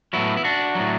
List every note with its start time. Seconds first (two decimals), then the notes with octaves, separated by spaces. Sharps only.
0.13 A2 F#3 B3 E4
0.37 E4
0.44 D4 F#4
0.75 A2 F#3